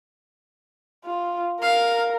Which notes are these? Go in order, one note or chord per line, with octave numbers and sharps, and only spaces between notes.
F4
A#4 F5